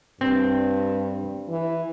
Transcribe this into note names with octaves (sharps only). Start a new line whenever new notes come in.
G2 C4
E3